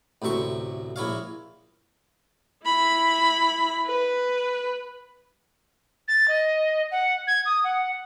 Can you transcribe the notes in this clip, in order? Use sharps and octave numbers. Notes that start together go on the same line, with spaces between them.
A1 D2 C3 E5 C#6
A#1 E4 C#5 F5
E4 B5
B4
A6
D#5
F#5
G#6
D#6
F#5